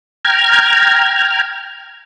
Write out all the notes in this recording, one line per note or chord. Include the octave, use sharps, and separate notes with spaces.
G5 A#5 F6 G#6